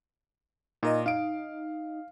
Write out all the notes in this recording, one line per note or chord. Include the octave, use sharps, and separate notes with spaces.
A#2 D#4 A#4 D#5
D#4 F5 D7